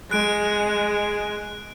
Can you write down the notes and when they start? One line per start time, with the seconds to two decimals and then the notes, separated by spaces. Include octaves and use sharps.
0.11 G#3 F#6 D7